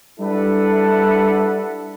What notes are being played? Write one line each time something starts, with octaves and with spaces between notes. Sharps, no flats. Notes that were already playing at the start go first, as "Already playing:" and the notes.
G3 D4 E4 A4 B4 F#5